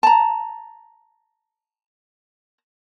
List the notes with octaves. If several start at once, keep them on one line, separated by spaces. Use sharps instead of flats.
A5 A#5